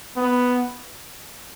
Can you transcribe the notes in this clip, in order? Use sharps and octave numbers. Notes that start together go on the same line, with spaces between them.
B3